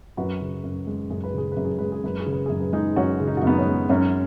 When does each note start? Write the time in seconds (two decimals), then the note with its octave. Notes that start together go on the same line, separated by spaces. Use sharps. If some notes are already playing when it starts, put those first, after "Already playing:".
0.17 F#2 F#4 B4
0.41 C#3
0.64 F#2
0.87 G#3
1.10 F#2 G#4
1.24 B4
1.34 C#3 G#4
1.52 F#2 B4
1.65 G#4
1.79 G#3 B4
1.92 G#4
2.04 F#2 B4
2.20 G#4
2.26 C#3
2.33 B4
2.46 F#2 G#4
2.60 B4
2.73 G#3 D#4 G#4
2.96 F#2 C#4 F#4
3.20 C#3
3.28 D#4
3.37 F#4
3.42 F#2 B3 D#4
3.59 C#4
3.66 G#3
3.89 F#2 C#4